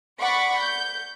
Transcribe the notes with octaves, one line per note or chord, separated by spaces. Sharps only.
D5 F#5 B5 C#6 D6
G6